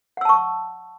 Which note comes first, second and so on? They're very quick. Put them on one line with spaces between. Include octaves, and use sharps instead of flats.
F#5 E6 A5 C#6